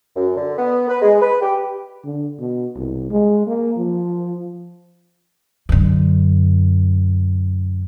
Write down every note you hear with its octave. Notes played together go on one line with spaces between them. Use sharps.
F#2
D3
B3
B4
G#3
B4
G4
D3
B2
C2
G#3
A#3
F3
F#2 D3